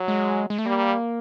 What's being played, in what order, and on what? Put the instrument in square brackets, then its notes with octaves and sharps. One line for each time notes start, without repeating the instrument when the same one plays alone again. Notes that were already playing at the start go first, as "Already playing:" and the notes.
Already playing: [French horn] F#3
[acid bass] G#3
G#3
A3
[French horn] G3 [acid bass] A#3